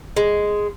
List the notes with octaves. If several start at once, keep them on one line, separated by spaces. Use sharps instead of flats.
G#3